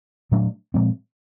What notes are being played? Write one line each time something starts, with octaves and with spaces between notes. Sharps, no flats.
A#2 F#3 A3 D4
A#2 F3 G#3 C4